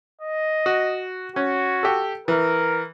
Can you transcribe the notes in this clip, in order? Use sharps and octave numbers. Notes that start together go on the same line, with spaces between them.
D#5
F#4
C#4 F#4
G4 A4
E3 A#4